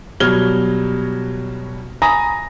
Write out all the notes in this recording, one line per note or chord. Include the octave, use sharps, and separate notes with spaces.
B2 F#3 G3 F6 G#6 G7
G#5 A#5 B5 D#6 A#6